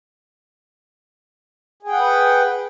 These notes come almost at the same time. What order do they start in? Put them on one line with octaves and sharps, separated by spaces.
G#4 G5 F#5 B4